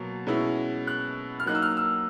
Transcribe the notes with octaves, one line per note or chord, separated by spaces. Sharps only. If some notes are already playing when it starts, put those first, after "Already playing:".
Already playing: B2 F#3 A#3
B2 G#3 C#4 E4
F#6
F6
F#3 A#3 D#4 F#6
E6
F6
E6